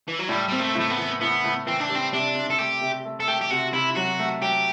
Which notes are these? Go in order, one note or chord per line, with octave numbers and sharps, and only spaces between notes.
E3
F#3
A2 G3
G3 C4
A3
A2 A3
B3
E3
A2 B3
A2
E3 C4
D4
G3
C4
C3 D4
C3
A4
A3 G4
C3
A3
A4
A3 G4
G4
C3 F#4
C3 E4
F#3 F#4
A3
F#3 G4